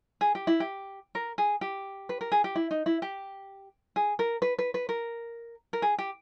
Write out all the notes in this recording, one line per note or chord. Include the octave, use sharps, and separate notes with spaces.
G#4
G4
E4
G4
A#4
G#4
G4
B4
A#4
G#4
G4
E4
D#4
E4
G4
G#4
A#4
B4
B4
B4
A#4
A#4
G#4
G4